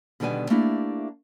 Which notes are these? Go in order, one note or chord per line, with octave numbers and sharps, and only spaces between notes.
B2 D3 D#3 G3 B3 G#5
A3 A#3 D4 E4 G4